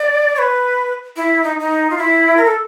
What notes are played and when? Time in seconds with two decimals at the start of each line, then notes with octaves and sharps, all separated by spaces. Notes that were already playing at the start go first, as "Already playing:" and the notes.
Already playing: D5
0.35 C#5
0.39 B4
1.16 E4
1.44 D#4
1.60 D#4
1.90 F4
1.98 E4
2.37 A#4
2.45 A4